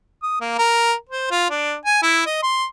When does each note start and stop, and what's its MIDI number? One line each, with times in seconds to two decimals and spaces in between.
0.23 0.37 87
0.40 0.54 58
0.58 0.93 70
1.09 1.28 72
1.31 1.48 65
1.50 1.74 62
1.85 2.02 80
2.03 2.22 64
2.26 2.39 75
2.42 2.65 84